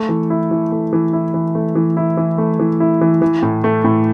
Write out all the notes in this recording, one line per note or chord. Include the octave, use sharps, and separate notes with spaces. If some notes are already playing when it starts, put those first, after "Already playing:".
Already playing: A3
E3
E4
E3
A3
E3
E4
E3
A3
E3
E4
E3
A3
E3
E4
E3
E3
A2
A3
A2